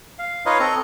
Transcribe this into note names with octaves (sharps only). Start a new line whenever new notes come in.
F5
D#4 F4 B4 C#5 D#5 F5
C4 A4 D#5 A#5 C#6